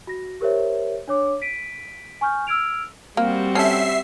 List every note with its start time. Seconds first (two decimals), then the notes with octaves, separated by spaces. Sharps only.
0.07 F#4 A#6
0.41 G4 A#4 C5 C#5 E5
1.08 D4 C#5 D6
1.42 B6 D7 D#7
2.21 G#5 C#6 F6 G6
2.47 E6 F6 G#6 D7 F7
3.17 G3 A#3 C4 F#4
3.55 C#4 A4 E5 C7